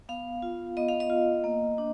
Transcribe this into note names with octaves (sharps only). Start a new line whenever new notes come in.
B3 F5
F4
B3 D#5
F5
D#5
F4
A#3
D4